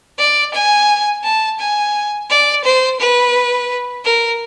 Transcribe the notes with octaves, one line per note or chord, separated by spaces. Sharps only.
D5
G#5
A5
G#5
D5
C5
B4
A#4